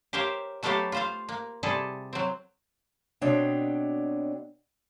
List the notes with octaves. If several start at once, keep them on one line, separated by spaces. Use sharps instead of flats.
G4 A#4 C5 C#5 E5 F5
F#3 A3 B3 G4 A4 F5
F4 C5 F5
A#3
C3 G3 E4 G#4 A4
F#3 C4
B2 C4 D4 C#5 D#5 G5